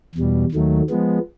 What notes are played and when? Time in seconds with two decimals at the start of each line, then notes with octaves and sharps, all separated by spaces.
0.15 E2 B2 G3
0.52 D#2 D#3 F#3 A3
0.90 F3 G#3 B3